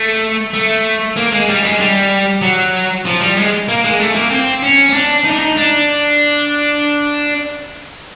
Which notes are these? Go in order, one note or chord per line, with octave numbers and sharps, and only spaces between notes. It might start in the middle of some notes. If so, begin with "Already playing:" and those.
Already playing: A3
A3
A#3
G#3
G3
G#3
G3
F#3
F3
G3
G#3
A#3
G#3
A3
A#3
C4
C#4
C#4
D4
D#4
D4
D#4
D4